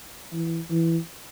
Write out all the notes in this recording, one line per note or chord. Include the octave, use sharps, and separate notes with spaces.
E3
E3